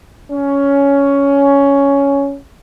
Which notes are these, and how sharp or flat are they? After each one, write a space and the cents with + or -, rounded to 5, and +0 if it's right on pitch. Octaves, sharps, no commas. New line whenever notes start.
C#4 +10